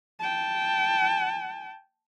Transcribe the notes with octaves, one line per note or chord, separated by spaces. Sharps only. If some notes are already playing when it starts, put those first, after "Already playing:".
G5 A5